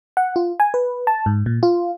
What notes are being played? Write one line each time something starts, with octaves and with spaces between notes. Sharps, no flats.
F#5
F4
G#5
B4
A5
G#2
A#2
F4